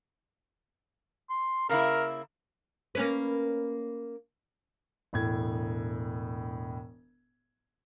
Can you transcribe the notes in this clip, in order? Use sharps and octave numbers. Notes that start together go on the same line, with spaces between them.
C6
C#3 A#3 E4 A#4
A#3 C#4 B4
E1 A2 G#6